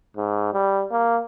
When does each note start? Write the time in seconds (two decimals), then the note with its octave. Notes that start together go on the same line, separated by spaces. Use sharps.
0.17 G#2
0.53 G3
0.91 A#3